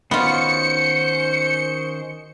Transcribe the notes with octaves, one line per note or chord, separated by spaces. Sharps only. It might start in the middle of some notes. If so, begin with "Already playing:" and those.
D#3 B3 C#4 F4 F#4 C5 C#7